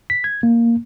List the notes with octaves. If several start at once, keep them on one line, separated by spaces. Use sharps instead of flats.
B6
G#6
A#3